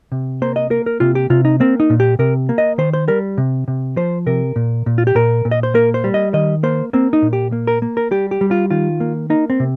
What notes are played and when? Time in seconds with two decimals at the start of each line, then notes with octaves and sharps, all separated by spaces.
0.12 C3
0.42 A#3 C5
0.56 D#5
0.71 A#3 A#4
0.86 A#4
1.00 C3 F4
1.15 G4
1.30 C3 F4
1.45 D#4
1.60 A#3 C4
1.80 D#4
1.90 A#2
2.00 G4
2.19 C3 A#4
2.49 A#3
2.58 D#5
2.78 D#3 C5
2.93 C5
3.08 G3 A#4
3.38 C3
3.68 C3
3.96 F3 C5
4.26 C3 A#4
4.56 A#2
4.86 A#2
4.98 F4
5.07 G4
5.15 A#2 A#4
5.45 A#2
5.51 D#5
5.63 C5
5.74 A#3 A#4
5.94 C5
6.04 G3
6.14 D#5
6.33 D#3 D#5
6.63 A#3 C5
6.93 A#3 C4
7.13 D#4
7.22 A#2
7.33 G4
7.52 A#3
7.67 A#4
7.82 A#3
7.97 A#4
8.11 G3 G4
8.31 G4
8.41 G3
8.51 F4
8.70 D#3 F4
9.00 A#3
9.30 A#3 D#4
9.50 C4
9.60 C3